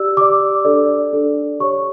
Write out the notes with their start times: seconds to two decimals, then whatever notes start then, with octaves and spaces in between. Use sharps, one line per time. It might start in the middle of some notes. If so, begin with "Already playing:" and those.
Already playing: G4 D5 E6
0.17 G4 D5 D6
0.65 D4 A4 D5
1.13 D4 A4 D5
1.60 G4 C#5 C#6